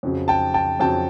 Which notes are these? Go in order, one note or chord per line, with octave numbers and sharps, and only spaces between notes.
F2 C#3 F#3
G5 A5
G5 A5
F2 C#3 F#3 G5 A5